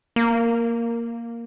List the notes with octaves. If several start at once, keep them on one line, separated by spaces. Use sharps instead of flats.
A#3